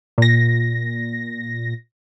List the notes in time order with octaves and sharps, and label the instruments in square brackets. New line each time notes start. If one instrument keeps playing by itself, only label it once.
[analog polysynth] A#2 A#6